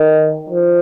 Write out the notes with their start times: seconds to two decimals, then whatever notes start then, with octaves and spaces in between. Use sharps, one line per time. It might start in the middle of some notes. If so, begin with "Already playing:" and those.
Already playing: D#3
0.50 F3